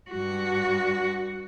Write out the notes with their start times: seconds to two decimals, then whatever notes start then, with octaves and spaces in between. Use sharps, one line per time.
0.11 G2 F#4